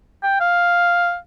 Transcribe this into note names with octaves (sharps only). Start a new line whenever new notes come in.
G5
F5